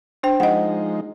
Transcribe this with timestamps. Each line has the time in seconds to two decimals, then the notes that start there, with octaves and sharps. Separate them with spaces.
0.23 D4 C5 G5
0.40 F3 G#3 D#4 D#5 F#5